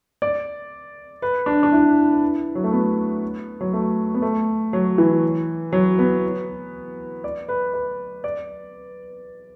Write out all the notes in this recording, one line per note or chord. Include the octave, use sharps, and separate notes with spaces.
D5
B4
D4
D4
E4
F#3
A3
B3
F#3
A3
B3
A3
F#3
E3
F#3
B3
D5
B4
B4
D5